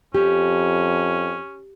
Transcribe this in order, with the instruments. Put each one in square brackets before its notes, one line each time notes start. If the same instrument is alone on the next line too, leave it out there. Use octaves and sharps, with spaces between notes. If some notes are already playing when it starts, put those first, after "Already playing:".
[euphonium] F2 [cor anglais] C#4 [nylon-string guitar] G4